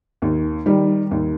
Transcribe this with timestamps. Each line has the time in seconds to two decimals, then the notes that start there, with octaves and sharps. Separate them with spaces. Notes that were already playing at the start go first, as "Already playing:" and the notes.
0.22 D#2
0.66 D#3 G3
1.11 D#2